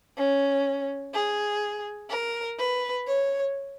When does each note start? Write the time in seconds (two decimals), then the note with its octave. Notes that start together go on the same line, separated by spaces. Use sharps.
0.17 C#4
1.14 G#4
2.10 A#4
2.59 B4
3.07 C#5